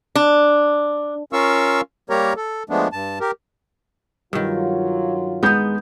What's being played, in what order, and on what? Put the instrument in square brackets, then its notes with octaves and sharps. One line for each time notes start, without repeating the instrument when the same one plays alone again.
[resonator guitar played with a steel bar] D4
[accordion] C#4 F4 A#4 F5 C#6 E6
G3 A#3 G4 A#4 C#5 A#5
A4
F3 G#3 A3 B3 D4
G2 A5
G4 A#4
[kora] G2 D#3 [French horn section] F#3 F4
[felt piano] G#3 G6 [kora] B3 D#4